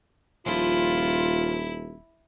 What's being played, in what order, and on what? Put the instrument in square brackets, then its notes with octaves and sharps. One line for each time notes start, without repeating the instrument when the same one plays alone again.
[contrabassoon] D#1 [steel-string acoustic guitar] F3 [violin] E4 [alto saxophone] F4